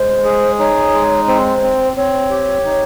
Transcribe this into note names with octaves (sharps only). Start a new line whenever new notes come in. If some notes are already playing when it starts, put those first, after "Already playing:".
Already playing: G#3 C5
G#4
D#4 C#5
G#3
C4 C5
C4
C4 C#5
G4
D#4